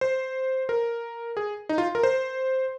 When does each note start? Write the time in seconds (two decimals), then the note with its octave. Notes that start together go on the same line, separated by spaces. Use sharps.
0.01 C5
0.69 A#4
1.37 G#4
1.69 D#4
1.78 F4
1.95 A#4
2.03 C5